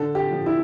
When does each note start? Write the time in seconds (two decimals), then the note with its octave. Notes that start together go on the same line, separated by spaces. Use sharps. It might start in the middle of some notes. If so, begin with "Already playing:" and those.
Already playing: D3 A4
0.15 G4
0.31 F3
0.46 E4